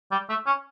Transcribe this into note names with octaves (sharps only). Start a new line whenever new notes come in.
G3
A3
C#4